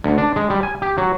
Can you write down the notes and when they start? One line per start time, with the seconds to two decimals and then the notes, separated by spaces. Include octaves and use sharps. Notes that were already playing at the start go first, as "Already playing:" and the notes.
0.04 D2
0.18 D4
0.36 G#3
0.50 G3
0.63 G#5
0.82 G4
0.98 F#3